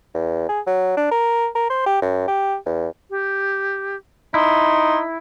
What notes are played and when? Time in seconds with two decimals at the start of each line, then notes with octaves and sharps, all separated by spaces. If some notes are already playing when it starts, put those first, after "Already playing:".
0.14 E2
0.49 G#4
0.67 F#3
0.97 D4
1.11 A#4
1.55 A#4
1.70 C5
1.86 G4
2.02 F#2
2.28 G4
2.66 E2
3.10 G4
4.34 D#4 E4 C6